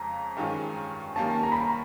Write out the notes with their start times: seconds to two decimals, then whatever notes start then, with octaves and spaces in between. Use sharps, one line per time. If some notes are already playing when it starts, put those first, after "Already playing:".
Already playing: F2 C#3 F3 G#3 C#4 A#5
0.37 G2 D#3 G#3 C#4 F4
1.16 D#3 G3 A#3 C#4 A5
1.43 A#5
1.52 B5
1.61 A#5